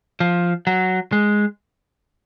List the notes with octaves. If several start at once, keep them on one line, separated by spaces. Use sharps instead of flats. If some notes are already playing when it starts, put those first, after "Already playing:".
F3
F#3
G#3